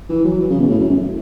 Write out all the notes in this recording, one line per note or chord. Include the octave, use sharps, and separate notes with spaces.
E3
F#3
E3
C#3
B2
A2
F#2
F#2